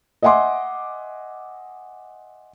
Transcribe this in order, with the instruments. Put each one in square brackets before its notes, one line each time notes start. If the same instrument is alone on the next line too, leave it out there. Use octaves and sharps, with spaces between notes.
[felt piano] D#5 E5 F#5 G#5 C6 D6